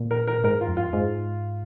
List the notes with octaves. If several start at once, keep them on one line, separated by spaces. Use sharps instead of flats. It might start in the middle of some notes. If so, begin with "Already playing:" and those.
Already playing: A#2
A#4
A#4
G#2 A#4
F4
F2
F4
G#2